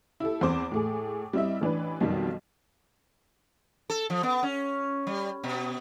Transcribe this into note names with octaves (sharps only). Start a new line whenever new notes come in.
E4 G4 A4
E2 C4 C5 D6
A2 A3 G#4
G3 C4 E4 D#5 E5
A1 E3 D4 B4
B1 F2 B2 D#3 G3 G4
A4
F3
B3
C#4
G3
B2